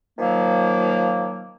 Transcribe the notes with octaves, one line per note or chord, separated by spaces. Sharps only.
D#3 F3 F#3 A#3